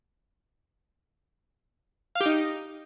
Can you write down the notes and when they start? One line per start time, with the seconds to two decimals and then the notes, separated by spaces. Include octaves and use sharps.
2.15 F5
2.21 G4
2.26 D#4